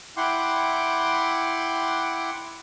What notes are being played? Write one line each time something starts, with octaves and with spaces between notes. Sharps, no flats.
E4 F#5 G5 C6 D6